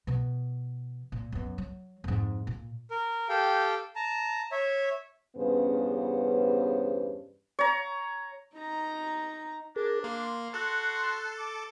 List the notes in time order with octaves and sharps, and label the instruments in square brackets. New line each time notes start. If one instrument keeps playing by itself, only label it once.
[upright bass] B2 E3
A#2
F#2 B3
F#3
F2 G#2
A#2
[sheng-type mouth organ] A#4
G4 A4 F5 G5
A5 A#5
C#5 E5
[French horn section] E2 G2 C#3 B3 C#4 C5
[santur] C#5 A#5
[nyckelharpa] D#4 A#5
[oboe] D4 [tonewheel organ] G#4 A#4
[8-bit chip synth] A#3 [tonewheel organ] C6
[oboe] F#4 [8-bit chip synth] A4 [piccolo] F#6
[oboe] D6